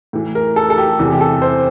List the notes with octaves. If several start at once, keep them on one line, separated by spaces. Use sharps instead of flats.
A2 E3
A#4
A4
A4
G4
E2 C3 E3
G4
A4
C5